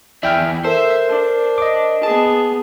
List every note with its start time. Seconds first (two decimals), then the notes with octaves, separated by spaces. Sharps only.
0.23 E2 E4 D5 E5 G5 F6
0.64 A4 A#4 C5 E5
1.09 D4
1.58 D#5 D6
2.03 B3 G#4 A5